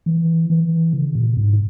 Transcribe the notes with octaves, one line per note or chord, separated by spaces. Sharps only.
E3
E3
C#3
A#2
G#2